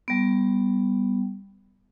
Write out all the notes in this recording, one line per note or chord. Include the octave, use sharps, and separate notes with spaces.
G3 B3